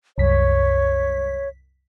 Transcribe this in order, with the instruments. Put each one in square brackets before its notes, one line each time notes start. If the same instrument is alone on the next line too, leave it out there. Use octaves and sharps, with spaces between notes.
[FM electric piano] C2 F#2 B6 [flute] C#5